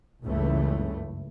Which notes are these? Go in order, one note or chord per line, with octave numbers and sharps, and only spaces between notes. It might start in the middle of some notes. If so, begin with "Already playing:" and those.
F#1 C#2 G2 E3 A3